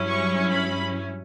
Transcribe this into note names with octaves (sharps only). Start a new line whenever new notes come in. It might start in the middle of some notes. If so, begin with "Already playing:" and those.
Already playing: G2 F#3 C#4 E4
C#6
B5